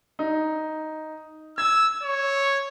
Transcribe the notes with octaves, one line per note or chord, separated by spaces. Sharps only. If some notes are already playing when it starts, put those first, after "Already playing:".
D#4
E6 G#6
C#5